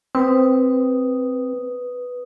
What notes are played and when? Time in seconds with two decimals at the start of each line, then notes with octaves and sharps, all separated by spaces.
0.15 C4 B4 D#6